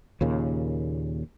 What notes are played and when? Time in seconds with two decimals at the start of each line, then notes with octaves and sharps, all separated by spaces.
0.21 D#2 A#2 C#3